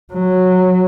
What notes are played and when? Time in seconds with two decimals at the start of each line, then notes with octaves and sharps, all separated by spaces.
0.13 F#3